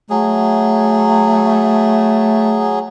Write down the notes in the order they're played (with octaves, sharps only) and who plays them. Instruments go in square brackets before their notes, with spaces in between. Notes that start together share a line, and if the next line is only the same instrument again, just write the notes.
[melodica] F#3 G#4 [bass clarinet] A3